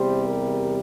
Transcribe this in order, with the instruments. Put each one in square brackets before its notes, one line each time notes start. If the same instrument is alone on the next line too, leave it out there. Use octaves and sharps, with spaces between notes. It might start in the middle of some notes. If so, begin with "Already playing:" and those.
Already playing: [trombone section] E2 C3 G3 C5
A#4